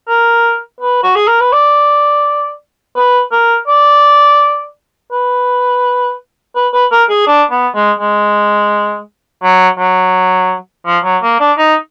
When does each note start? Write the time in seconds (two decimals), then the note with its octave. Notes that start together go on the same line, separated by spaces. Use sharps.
0.08 A#4
0.81 B4
1.03 F#4
1.16 G#4
1.28 A#4
1.41 B4
1.53 D5
2.96 B4
3.32 A#4
3.68 D5
5.12 B4
6.55 B4
6.73 B4
6.91 A#4
7.10 G#4
7.27 D4
7.51 B3
7.75 G#3
7.99 G#3
9.43 F#3
9.78 F#3
10.86 F3
11.04 F#3
11.23 A#3
11.40 D4
11.58 D#4